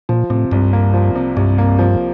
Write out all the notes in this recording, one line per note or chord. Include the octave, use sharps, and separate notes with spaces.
A#2 F3
A2 C3
C2 G2
A#3
F3
C3
C2 G2
A#3
F3